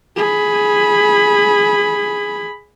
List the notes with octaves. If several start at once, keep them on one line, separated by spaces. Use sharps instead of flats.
G#4 B5